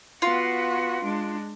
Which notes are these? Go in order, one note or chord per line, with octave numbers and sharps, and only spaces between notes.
B3 F4 F#4
G#3 D4